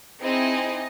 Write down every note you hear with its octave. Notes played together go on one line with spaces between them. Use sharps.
C4 D#4 E4 G#4 D#5